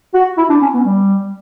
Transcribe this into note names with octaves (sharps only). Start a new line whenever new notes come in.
F#4
E4
D4
C#4
B3
G3